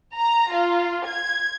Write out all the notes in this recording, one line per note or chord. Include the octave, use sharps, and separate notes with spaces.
A#5
F4
G#6